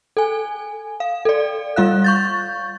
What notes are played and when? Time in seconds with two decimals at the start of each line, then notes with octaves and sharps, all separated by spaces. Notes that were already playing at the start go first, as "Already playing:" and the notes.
0.17 A4 G#5
1.00 F5
1.25 A4 D5
1.76 G3 F4 F5 F#6
2.04 C#6 G6 A6